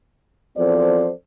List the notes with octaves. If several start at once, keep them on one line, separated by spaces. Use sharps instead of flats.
E2 F3 C4 A4 C5 D5